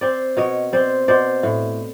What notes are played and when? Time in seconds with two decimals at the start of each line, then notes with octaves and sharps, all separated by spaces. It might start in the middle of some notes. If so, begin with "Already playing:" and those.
0.01 C4 C5 D5
0.37 B2 C#5 D#5
0.73 C4 C5 D5
1.08 B2 C5 D5
1.43 A2